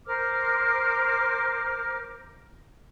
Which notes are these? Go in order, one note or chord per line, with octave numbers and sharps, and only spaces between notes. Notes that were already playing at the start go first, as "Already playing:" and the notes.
A#4 C5 D6 F6